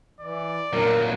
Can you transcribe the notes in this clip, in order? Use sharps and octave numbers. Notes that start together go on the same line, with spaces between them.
E3 D5
A#2 F#3 A#4